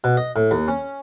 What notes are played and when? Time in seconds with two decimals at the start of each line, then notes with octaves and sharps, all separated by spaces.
0.04 B2
0.17 D#5
0.36 A2
0.51 D#2
0.68 C#4